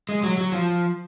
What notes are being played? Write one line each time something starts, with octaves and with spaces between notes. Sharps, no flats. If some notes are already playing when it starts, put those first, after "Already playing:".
G#3
F#3
F#3
F3